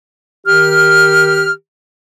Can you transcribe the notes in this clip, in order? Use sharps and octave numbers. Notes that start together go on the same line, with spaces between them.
D#3 G4 F6